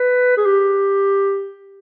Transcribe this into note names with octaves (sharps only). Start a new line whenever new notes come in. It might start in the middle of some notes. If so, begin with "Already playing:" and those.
Already playing: B4
G#4
G4